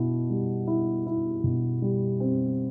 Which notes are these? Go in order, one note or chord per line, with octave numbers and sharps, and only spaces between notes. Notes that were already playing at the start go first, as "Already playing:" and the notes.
Already playing: B2 E4
G3
E4
E4
B2
G3
C4